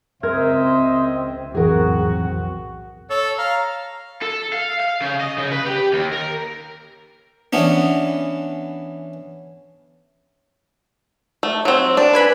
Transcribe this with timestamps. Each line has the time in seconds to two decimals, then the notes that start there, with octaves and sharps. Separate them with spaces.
0.23 C#2 C4 A#4 C5 D#5 E5 F6 G#6
1.55 B1 F2 A2 E3 C4 F#4 G#4 A#4
3.10 A4 C#5
3.38 F5 A#5
4.22 A4
4.53 F5
4.80 F5
5.02 C#3
5.21 D#5
5.38 C#3
5.52 B4
5.66 G4
5.93 D#2
6.13 A#4
7.53 E3 B3 C#4 D4
11.43 A3
11.65 F#3 C4
11.97 D4
12.13 B4 G#5 B5